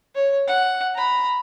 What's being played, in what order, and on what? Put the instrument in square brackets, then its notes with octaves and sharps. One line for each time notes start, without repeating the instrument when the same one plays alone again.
[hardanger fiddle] C#5
F#5
A#5 B5